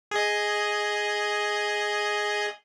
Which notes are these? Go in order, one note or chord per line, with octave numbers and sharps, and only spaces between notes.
G#4 D#5